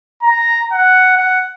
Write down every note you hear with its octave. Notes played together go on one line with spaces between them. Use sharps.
A#5
F#5
F#5